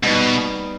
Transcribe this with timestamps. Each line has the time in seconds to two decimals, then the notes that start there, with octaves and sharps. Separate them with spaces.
0.03 B2 G3 B3 D#4